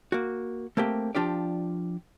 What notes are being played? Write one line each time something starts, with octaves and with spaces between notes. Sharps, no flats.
A#3 F#4
A3 A#3 C4 G4
F3 D4 F4 G4 D5